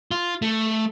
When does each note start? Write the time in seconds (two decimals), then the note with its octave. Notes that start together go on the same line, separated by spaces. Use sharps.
0.11 F4
0.42 A3